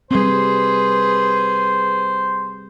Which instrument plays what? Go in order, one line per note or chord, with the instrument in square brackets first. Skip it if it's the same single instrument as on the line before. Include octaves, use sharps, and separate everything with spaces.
[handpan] G3 C4 [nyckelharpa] G#4 B4 [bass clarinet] C5